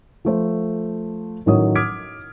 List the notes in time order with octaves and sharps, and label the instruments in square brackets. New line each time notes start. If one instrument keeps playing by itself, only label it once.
[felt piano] F3 A3 C5
A1 A2 D#3 F#3 C#5 D#6
D6 D#6 F6 G#6 B6 D7